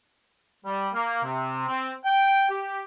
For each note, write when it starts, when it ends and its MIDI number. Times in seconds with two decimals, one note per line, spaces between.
0.65 0.88 55
0.94 1.20 58
1.24 1.66 48
1.67 1.91 60
2.06 2.49 79
2.49 2.82 67